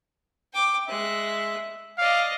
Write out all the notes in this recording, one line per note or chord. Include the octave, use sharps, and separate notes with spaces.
G5 D6
G#3 E5 F#6
D5 D#5 F5